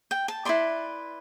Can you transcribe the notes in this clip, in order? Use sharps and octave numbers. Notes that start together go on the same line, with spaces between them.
G5
A5
E4 B4 D5 C6